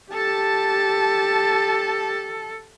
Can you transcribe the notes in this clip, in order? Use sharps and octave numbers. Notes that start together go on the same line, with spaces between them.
G4 A4 A5